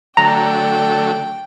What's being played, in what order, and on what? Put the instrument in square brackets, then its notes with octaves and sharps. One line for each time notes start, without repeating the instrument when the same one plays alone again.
[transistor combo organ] D3 F#3 A3 [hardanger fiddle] G5 [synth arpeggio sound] A#5